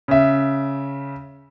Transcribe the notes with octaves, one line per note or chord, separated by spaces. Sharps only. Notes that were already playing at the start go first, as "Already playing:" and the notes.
C#3 E5